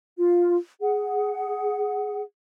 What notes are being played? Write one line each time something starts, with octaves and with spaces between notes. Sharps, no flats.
F4
G#4 F#5